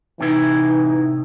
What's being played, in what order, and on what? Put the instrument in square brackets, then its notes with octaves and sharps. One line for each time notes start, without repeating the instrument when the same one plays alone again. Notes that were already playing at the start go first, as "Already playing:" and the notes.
[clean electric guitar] A2 C3 E4 [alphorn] E3 [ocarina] D#4